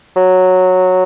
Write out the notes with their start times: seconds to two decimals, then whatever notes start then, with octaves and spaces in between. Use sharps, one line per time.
0.16 F#3